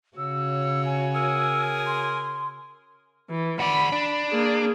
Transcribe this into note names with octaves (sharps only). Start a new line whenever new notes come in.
C#3 F#4 C#5 E6
G#5
G#4 A#4 E6
C6
E3
F#4 D5 B5
D4
A#3 G#4